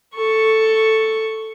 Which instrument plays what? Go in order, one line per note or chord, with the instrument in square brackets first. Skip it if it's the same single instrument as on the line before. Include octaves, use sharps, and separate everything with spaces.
[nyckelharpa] A4 C#6